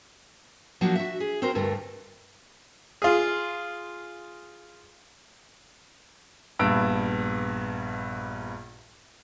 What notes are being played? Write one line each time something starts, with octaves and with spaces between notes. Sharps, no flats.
F3 F#3 A#3 D4 F#4
F#4 E5
G#4
C4 F#4 A#4 C5
D2 G2 A3 A#4
F4 G#4
A#1 G2 B3 E6 D7